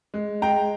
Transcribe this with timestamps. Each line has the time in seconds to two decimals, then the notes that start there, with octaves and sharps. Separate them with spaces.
0.14 G#3
0.42 G#3 G5 A#5